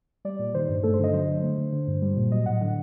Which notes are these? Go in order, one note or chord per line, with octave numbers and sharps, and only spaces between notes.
G3 D5
A#2
D#3 C5
G2 C5
A3 A4
C5
D3 D#5
F#3 C5
D3
A3
D3
D3
G2
G3
A#2
F#3 D#5
A2 F#5
D3 F#5